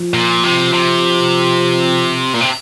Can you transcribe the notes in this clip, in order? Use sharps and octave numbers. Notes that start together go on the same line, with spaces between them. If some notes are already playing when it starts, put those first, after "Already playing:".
Already playing: F3
A#2
C3
C3
A#2
C3